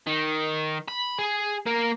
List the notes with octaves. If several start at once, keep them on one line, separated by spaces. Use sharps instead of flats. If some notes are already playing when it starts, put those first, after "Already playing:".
D#3
B5
G#4
A#3 A#4